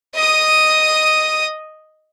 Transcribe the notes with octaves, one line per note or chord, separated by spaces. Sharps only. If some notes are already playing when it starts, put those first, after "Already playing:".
D#5 D#6